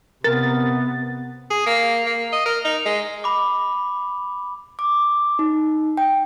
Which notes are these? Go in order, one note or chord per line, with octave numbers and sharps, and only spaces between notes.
C3 B3 A#4 A6
G#4
A#3
A#3
D#5
A#4
D#4
G#3
B5 D6
D6
D#4
G5